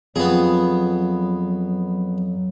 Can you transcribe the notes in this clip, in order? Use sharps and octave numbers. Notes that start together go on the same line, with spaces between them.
F2 F#3 B3 G#4